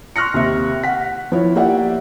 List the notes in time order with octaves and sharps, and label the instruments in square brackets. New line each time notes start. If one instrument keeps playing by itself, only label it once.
[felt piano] C6 C#6 F6 F#6 A#6 C#7
D#2 C3 E5
F#5 B6
F3 E4 C#5
A#3 G4 D5 E5 F#5